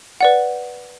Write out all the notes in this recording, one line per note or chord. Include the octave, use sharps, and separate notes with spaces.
B4 D5 F#5